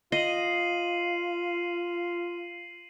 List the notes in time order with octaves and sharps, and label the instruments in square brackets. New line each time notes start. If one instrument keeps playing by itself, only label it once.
[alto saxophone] F4 [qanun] D#5 [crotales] C7 D#7 F#7